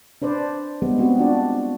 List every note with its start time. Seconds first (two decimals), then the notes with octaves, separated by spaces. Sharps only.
0.22 D4 B4 C5 D5
0.82 G3 G#3 B3
0.98 B3 C4 F#4
1.19 D4 F4 F#4 D5